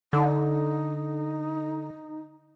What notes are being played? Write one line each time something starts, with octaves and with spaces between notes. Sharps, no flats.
D3 D#4